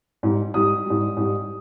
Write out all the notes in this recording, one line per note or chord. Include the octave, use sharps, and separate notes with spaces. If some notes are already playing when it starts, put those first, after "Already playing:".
G#2 G3
G#2 G3 D#6
G#2 G3
G#2 G3